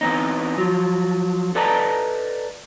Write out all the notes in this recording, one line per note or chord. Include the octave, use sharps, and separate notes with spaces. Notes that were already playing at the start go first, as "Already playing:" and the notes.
E3 B3 C4 D#4
F3 F#3
A4 B4 D5 D#5 A5 A#5